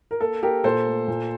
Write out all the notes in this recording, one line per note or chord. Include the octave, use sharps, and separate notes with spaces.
A#4
A#3 A4
A#3 G4 A#4
A#2 A4 C5
A3
A#2